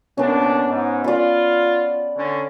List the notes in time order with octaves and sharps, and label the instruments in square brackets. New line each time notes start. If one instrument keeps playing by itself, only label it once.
[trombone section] C2 A#2 D4 [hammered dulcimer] B3 C#4
[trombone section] G#2
[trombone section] F4 [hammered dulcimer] D5 B5
[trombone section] D3 C#4